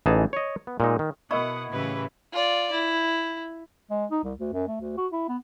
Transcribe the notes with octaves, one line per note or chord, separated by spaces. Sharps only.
A1 E3 D#4 G#4 A5
C#5 D#5
B3
A#2 G#3 D#4
D#3
B2 E4 A#4 D#5 F#5 C#6 D#6
A2 C#3 E3 G4 B4
F4 D5
E4
G#3
D#4
C2
D2
F#2
A3
D2
F#4
E4
B3